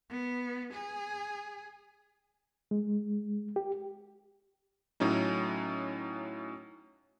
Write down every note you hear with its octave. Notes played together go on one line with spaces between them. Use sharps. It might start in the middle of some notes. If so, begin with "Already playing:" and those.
B3
G#4
G#3
G4
A2 F#3 C#4 D#4